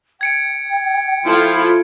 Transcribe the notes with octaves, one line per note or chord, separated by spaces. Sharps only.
G5 G#6 C#7 D7
F3 E4 F4 A4 C5